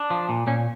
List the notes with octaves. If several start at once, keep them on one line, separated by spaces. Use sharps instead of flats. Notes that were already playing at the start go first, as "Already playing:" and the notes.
Already playing: D4
F3
A#2
A#2 C#4